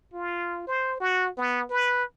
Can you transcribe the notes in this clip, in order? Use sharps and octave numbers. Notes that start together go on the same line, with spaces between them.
F4
C5
F#4
B3
B4